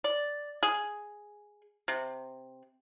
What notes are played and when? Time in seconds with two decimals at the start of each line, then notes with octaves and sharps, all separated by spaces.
0.04 D5
0.63 G#4
1.88 C3